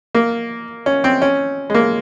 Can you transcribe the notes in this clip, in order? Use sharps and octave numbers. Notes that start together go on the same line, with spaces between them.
A#3
C#4
C4
C#4
G#3
A#3